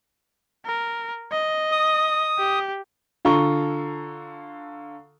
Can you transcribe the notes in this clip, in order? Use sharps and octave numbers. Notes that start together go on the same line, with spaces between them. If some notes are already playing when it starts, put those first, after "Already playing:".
A#4
D#5
D#6
G4
D3 F4 A4 A#5 C#6 G7